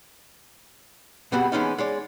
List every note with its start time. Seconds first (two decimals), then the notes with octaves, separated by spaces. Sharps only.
1.32 B2 G3 B3 C4 F#4 G#4
1.52 E3 G#3 B3 C#4 D#4
1.78 G#3 C#5 D5